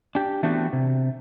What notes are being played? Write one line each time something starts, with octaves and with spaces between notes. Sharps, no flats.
D4 G4
E3 A3 B3 C4 D4 F#4
C3